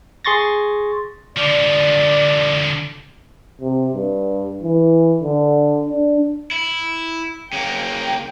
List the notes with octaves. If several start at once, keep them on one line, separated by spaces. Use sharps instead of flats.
G#4 C6 C#6 A6 A#6
D3 F3 D5
C3
G2
E3
D3
D4
E4
C#3 A#3 G5